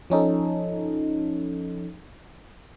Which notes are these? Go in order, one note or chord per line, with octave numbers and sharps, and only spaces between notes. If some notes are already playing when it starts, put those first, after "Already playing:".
F3 C#4 D#4 A4